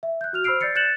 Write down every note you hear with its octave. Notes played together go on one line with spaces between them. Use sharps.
E5
F#6 G6
F#4 F6 F7
C5 B5 E6 F6 C7 D7
D5 G6 A6 C7 C#7
F#6 G6 A6 C#7 E7 F#7